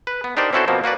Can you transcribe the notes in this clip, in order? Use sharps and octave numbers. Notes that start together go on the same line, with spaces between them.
B4
B3
D4 D#4 G4 A#4 C5 D5
C4 C#4 E4 F#4 A4 C5
B2 F3 A#3 C4
A#3 F#4 B4 D5